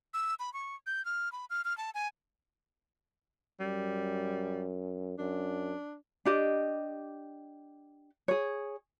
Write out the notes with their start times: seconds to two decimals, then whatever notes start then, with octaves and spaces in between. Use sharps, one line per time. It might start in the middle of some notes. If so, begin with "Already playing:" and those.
0.14 E6
0.39 B5
0.53 C#6
0.87 G6
1.05 F6
1.32 B5
1.50 F6
1.65 F6
1.78 A5
1.94 G#5
3.60 F#2 G3
5.19 F#2 D4
6.25 D4 G4 D#5
8.28 G#4 C#5